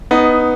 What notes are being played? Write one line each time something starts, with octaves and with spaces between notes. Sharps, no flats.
B3 D#4